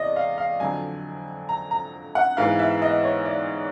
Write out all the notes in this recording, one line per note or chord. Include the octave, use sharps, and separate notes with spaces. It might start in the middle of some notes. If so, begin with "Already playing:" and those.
Already playing: E2 C3 G#3 D5 D#5
F5
F5
F2 D3 F#3 G#5
A#5
A#5
F#5
G#2 E3 G#3 B3 F5
E5
D#5
C#5
D5